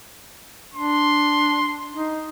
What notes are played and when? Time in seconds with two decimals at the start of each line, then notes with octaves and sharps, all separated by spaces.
0.74 D4 C6
1.94 D#4